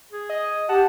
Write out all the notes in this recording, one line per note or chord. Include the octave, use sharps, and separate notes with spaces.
G#4
D#5
G4 F#5 A5